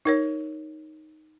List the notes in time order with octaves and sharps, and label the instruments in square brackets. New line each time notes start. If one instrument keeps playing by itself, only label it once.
[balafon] D#4 A#4 C#5